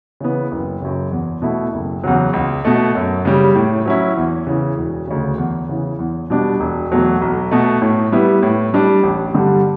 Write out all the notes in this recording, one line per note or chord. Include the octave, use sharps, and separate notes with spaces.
C#3 E3 B3
F#1
F#2 C#3
E2
B2 A3 E4
F#1
E2 C#3 F#3
C#2
B2 A3
F#2
C#3 G3
A2
F#3 C#4 E4
E2
C#3 E3
E1
D2 C#3
E2
C#3 E3
E2
B2 G3 D4
E1
E2 B2 F#3 A3
B1
B2 A3
A2
G3 B3 E4
A2
G3 D4
A1
G2 D3 G3